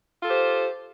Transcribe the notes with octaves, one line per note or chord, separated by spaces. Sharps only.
F4 G4 A4 C5